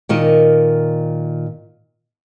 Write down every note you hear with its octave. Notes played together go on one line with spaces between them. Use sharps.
A#2 D#3 A#4 D#5